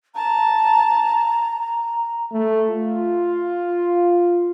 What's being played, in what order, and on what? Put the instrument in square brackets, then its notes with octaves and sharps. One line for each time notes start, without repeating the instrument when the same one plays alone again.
[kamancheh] A5 [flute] A#5
[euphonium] A3
F4